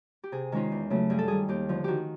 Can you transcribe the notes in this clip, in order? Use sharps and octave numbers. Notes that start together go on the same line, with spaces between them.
G4
C3 G#4
D#3 G#3 C#4 F4
E2
C#3 F#3 A3
G2 G#4
A4
D#3 G3 G#4
D#2 G4
D3 F3
D#3 F#4 G4